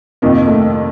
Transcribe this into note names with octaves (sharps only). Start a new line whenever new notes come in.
F2 C3 D#3 A#3
A3